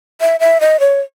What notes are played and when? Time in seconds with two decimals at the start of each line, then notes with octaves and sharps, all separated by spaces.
0.21 E5
0.40 E5
0.61 D#5
0.80 C#5